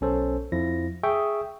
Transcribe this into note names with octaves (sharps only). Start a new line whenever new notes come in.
B1 C#4 A4 C5
F2 F3 E4 A#6
G#4 E5 G5 C#6 D#6 E6